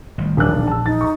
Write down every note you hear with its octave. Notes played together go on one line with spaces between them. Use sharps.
A1 D#3 G3
D#1 A#1 E3 D4 F#6
B1
A5 E6
D#4 A6
A#5 C#6